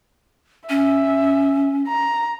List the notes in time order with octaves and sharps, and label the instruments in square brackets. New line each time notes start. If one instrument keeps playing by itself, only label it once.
[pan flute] C#4 [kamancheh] E5
[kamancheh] A#5